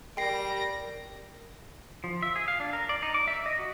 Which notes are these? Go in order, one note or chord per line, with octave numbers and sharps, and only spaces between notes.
G3 A#4 G5 A#6 C7 D7
F3
E5
G#4
F5
D4
A#4
D5
D#4
D6
E5
D#5
F#4